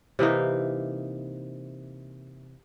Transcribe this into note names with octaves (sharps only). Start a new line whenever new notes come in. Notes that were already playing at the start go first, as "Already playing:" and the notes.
C3 E3 A#3 D#4